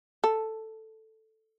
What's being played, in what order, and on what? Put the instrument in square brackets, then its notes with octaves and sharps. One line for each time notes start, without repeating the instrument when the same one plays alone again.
[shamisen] A4